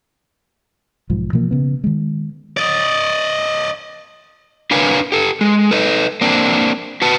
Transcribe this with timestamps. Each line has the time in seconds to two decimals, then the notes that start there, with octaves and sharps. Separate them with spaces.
1.10 B1 G#2 F3
1.33 B2 E3 F3 A#3
1.51 C#3 B3
1.84 D#3 G#3
2.57 D5 D#5
4.71 D4 A#4 B4 C#5 F5 G#5
5.12 G4 A4
5.41 G#3
5.71 A4 B4 D#5
6.21 A#3 C4 D4
7.02 F#4 B4 A5